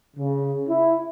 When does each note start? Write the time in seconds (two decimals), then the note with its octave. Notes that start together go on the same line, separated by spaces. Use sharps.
0.17 C#3
0.68 E4